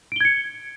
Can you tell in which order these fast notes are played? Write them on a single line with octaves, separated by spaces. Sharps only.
D7 G7 G#6 C#7